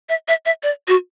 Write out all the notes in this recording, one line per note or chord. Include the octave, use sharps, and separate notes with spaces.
E5
E5
E5
D5
F#4